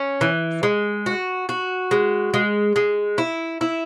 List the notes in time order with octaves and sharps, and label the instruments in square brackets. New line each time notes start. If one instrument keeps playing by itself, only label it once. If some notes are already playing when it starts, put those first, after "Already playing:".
Already playing: [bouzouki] C#4
E3
G#3
F#4
F#4
G#3
G#3
G#3
E4
E4